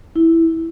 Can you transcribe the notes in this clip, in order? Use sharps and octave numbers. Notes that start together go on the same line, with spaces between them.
E4